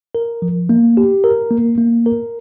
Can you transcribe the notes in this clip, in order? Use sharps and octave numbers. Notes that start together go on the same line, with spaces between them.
A#4
F3
A#3
G4
A#4
A#3
A#3
A#4